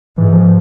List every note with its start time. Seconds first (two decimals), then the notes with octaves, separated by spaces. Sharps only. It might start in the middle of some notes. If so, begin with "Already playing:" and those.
0.17 G#2 E3
0.33 F3